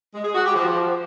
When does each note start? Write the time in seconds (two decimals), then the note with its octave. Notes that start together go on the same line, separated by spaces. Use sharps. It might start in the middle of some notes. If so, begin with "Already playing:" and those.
0.14 G#3
0.24 G#4
0.34 F#4
0.45 G4
0.55 F3